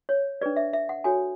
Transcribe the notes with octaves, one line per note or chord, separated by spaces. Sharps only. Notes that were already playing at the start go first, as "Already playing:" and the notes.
C#5
D4 G#4 B4 D5
E5
E5
F#5
F#4 A4 C#5 G#5